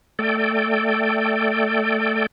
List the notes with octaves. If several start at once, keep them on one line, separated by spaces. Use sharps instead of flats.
A3 A4 D5 G5